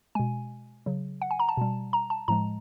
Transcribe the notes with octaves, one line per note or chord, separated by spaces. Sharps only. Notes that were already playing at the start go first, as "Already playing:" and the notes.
B2 G#3 G#5
C#3 F#3
F#5
G#5
A#5
A5
B2 G3
A#5
A5
A2 F3 G#3 A#5